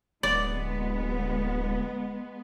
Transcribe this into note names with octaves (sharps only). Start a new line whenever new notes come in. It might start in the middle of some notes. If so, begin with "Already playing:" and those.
D1 G#3 B3 D5